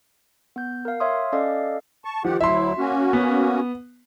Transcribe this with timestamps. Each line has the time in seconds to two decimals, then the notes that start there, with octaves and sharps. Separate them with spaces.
0.56 B3 G6
0.85 A#4 F5
1.00 C#5 E5 F5 C6 D#6
1.32 C#4 A4 D5 D#5 F5
2.05 A5 C#6
2.25 D#3 F3 G4 F#5
2.41 D2 F#3 E4 E5 C6
2.78 A#3 C#4 F#4
3.13 B3